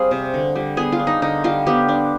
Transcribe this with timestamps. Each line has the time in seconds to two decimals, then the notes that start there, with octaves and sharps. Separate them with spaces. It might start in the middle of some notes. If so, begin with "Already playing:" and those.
Already playing: G3 C4 F4 G#4
0.11 C3
0.34 D3
0.55 G3
0.77 B3 G#4
0.92 F4
0.99 D4
1.07 D#4
1.22 D3 D#4
1.44 G3 F4
1.67 B3 G4
1.88 D4